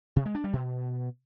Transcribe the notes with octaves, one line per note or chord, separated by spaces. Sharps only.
C3
G#3
D4
G3
B2